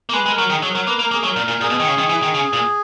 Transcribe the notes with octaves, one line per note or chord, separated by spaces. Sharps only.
A#3
G#3 B4
G#3
A#4
F#3
D#3 G#4
F#3
A#4
F#3
A#3 B4
A#3 A#4
A#3 G#4
F#3
A#4
A#2
A#2
A#2 G#4
B2
D#3
C#3
D#3
E3
D#3
C#3
A#2